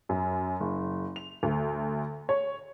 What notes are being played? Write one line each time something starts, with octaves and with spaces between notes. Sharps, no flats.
F#2
F#1
F7
D2
C#5